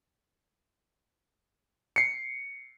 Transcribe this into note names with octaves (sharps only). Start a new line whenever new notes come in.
C7 C#7